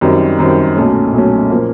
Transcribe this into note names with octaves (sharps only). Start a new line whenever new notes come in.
F#2 D#3 G3 C4
F#2 D#3 G3 C4
B1 A#2 F#3 A3 C#4
B1 A#2 F#3 A3 C#4
A#2 F3 A#3